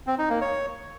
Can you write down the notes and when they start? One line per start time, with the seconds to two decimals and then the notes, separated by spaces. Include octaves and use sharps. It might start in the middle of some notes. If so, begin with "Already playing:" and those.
0.07 C4
0.18 D#4
0.30 A#3
0.41 C#5